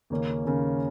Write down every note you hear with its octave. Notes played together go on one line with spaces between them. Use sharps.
D#2 C#3 A#3 C#4
D#2 C#3 A#3 C#4